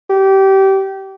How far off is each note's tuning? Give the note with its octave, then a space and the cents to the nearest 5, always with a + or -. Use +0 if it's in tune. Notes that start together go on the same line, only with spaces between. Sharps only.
G4 -25